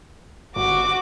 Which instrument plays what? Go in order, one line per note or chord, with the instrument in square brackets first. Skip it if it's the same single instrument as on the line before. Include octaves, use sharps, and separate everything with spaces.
[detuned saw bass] G1 [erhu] F#4 [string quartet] D6